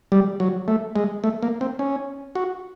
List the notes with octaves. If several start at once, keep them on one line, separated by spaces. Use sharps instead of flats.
G3
F#3
A3
G#3
A3
A#3
C4
C#4
F#4